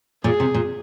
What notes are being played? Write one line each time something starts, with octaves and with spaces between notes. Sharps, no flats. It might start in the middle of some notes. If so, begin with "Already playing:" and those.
A#2 G#4
C3
A#2